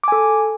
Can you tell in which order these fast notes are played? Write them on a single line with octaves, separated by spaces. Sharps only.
D6 G#5 A4